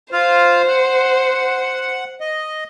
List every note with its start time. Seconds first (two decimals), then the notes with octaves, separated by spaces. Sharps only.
0.12 F4 C5 F5
0.67 F#5
2.20 D#5